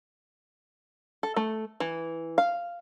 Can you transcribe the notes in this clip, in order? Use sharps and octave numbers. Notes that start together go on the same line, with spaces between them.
A4
A3
E3
F5